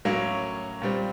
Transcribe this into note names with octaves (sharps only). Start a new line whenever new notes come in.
A2 F#3 A#3 C#4
A#2 G3 C4